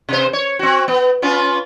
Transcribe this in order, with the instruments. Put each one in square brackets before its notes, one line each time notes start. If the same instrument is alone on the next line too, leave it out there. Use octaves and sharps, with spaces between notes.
[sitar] C3 C5
C#5
C4 F#4
B3
B3 C#4 F4